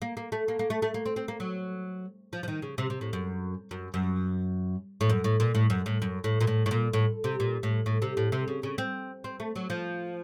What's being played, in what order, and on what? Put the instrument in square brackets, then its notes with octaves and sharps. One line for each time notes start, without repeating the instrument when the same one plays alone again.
[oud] A#3
A#3
A3
A#3
A#3
A3
A3
A#3
C4
C4
A#3
F#3
F3
F3
D#3
C#3
C3
C3
A2
F#2
F#2
F#2
A2
F#2
A2
A#2
A2
F#2
A2
F#2
A2
A#2
A2
A2
A#2
A2
C3
A#2
A2
A2
C3
A2
C3
C#3
C#3
C4
C4
A3
F#3
F3